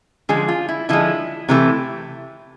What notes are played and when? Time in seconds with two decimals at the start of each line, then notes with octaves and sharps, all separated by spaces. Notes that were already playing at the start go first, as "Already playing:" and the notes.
0.29 D3 F3 G#3 G#4
0.48 F4
0.69 E4
0.89 D3 F3 G#3 E4
1.49 C3 E3 A3